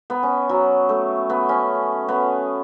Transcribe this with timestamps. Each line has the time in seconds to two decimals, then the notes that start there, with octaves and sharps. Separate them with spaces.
0.10 B3
0.23 C#4
0.49 F#3
0.89 A3
1.30 B3
1.49 C#4
2.08 B3